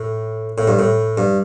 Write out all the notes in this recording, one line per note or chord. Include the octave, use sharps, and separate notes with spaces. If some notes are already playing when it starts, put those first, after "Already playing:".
Already playing: A2
A2
G2
A2
G2